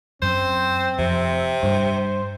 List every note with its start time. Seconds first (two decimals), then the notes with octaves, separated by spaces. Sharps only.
0.22 F#2 C4 C5
0.99 F2 C3
1.63 G2 C5